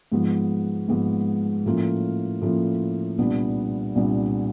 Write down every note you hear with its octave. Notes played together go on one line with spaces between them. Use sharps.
G#2 F3 G#3 B3
G#2 F3 G#3 B3
A2 F3 A#3 C#4 F4
A2 F3 A#3 C#4 F4
C2 A#2 G3 B3 D4
C2 A#2 G3 B3 D4